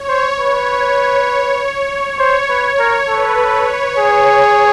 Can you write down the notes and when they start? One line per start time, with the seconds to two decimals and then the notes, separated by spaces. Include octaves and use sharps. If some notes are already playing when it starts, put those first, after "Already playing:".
Already playing: C#5
0.08 C5
0.39 B4 C#5
2.18 C5 C#5
2.49 B4
2.64 C#5
2.79 A#4
3.08 A4 B4
3.54 C#5
3.98 G#4